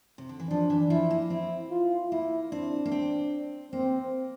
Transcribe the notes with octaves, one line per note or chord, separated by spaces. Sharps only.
C3
D3
E3
F3 D4
E3
F3 E4
A#3
C4 E4
F4
A#3 E4
C4 D4
A#3
C4
A#3 C4